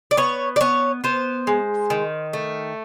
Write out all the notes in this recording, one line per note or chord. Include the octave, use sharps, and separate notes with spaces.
D5
B3 C#5
D5
B3 C#5
B3 C5
G#3
D#3
A3